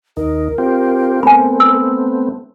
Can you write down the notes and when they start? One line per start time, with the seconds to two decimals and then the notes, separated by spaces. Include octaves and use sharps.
0.17 D#2 D#4 A#4
0.58 C4 F4 G4
1.23 A3 B3 C4 G#5 B5
1.60 E6